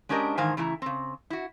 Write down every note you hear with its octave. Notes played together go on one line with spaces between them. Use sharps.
G#3 C#4 D4 G4 A#4 D#5
G#2 D#3 E3 C5 F5 G#5
C#3 E3 A3 E4 A#5
C#3 C4
E4 F#4